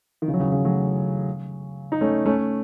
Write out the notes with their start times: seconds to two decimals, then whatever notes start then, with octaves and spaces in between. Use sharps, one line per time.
0.22 D#3
0.28 C#3 E3
0.34 F#3
0.39 C#3 E3
0.52 C#3 E3
0.65 F#3 A3
1.92 D#4
2.01 A3 C#4
2.26 A3 C#4